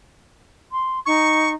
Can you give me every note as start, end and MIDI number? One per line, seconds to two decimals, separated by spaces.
0.71 0.99 84
1.06 1.54 63
1.06 1.50 85